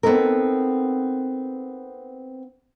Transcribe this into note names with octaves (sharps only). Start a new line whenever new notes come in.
B3 C4 D#4 A4 A#4